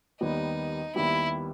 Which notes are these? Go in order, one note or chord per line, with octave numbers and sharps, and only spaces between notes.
D#2 D#3 G3 B3 D#4
D#2 D#3 G3 B3 E4